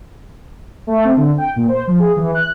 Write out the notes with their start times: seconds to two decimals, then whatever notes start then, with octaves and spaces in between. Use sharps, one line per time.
0.87 A3
1.05 C4
1.17 D3
1.38 G5
1.56 A#2
1.69 C5
1.87 F3
1.99 G#4
2.16 E3
2.35 F#6